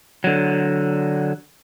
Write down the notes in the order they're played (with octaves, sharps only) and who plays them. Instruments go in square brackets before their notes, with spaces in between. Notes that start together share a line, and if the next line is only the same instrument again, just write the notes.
[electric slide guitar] D3 F#3